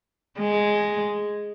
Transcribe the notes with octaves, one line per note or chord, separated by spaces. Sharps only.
G#3